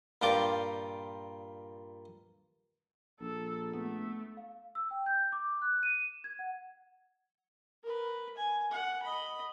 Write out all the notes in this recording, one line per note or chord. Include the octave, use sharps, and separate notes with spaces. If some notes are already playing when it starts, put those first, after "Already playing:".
G2 A#2 F4 G5 D6
A#1 A4
A3 B3
F5
E6
G5
G6
D6
F#6
D#7
E7
G#6
F#5
A#4 B4
G#5
F#5
D#5 B5